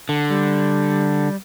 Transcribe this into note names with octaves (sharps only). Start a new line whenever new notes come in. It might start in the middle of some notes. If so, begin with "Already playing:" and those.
D3
G3